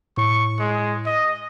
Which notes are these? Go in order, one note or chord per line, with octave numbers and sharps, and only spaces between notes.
A2 C#6
G#3
D#5